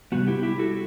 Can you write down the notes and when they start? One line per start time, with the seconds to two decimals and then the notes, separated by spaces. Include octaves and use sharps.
0.12 C3 G3 B3 F#4
0.27 E4 G4
0.43 E4 G4
0.59 F#4 A4